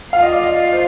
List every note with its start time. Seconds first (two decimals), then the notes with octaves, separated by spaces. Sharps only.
0.13 F4 F5
0.22 D#5
0.32 D5
0.42 D#5
0.73 C5